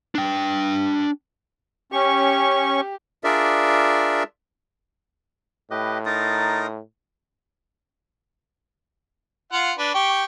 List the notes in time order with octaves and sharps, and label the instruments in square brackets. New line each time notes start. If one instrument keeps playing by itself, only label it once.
[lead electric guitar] D4 G5
[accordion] C#4 C#6 [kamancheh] G4
[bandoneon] D4 F4 G#4 A#4 D5 E5
[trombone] A2 [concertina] G4 B4 D#5
[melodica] D#4 A#4 [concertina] C6 D#6 [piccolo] A6
[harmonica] F4 F5 F#5
D4 B4
G4 G5 C#6